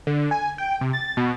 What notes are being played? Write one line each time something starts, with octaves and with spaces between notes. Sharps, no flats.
D3
G#5
G5
C3
A6
B2